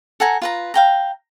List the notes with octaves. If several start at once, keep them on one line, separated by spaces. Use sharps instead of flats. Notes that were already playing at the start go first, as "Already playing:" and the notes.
A4 F#5 G#5 A#5
F4 B4 A#5
F5 G5 A#5